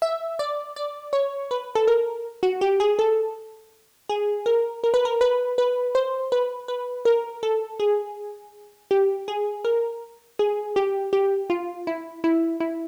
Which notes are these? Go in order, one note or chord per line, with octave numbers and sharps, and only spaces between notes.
E5
D5
D5
C#5
B4
A4
A#4
F#4
G4
G#4
A4
G#4
A#4
A#4
B4
A#4
B4
B4
C5
B4
B4
A#4
A4
G#4
G4
G#4
A#4
G#4
G4
G4
F4
E4
E4
E4